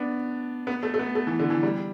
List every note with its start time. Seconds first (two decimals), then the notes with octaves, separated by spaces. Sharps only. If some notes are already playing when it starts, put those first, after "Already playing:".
Already playing: B3 D4
0.67 B3
0.83 A3
0.94 A3
0.99 B3
1.15 A3
1.27 E3
1.39 D3
1.50 E3
1.63 G3